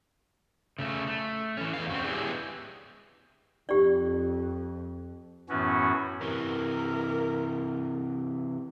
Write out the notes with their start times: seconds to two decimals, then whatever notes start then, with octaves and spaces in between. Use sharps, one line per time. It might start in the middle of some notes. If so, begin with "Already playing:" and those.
0.79 C#3 A3
1.07 A3
1.57 E3 C#4
1.73 E2 F5
1.90 C4 C#4 F#4
2.04 G#3 B3 D4 E4 G4 G#4
3.69 F2 G4 D5
5.49 F#2 A2 E3 B3 C#4 F#4
6.21 C3 E3 A#4